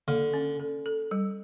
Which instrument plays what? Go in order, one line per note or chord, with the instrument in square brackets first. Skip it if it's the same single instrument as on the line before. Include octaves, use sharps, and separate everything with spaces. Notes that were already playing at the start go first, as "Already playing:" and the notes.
[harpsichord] D3 [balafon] A#3
[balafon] C#4
A4
A4
G3